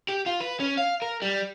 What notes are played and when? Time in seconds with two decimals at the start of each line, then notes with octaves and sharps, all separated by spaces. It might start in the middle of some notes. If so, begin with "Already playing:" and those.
0.09 G4
0.26 F4
0.40 B4
0.60 C#4
0.77 F5
1.02 A#4
1.22 G3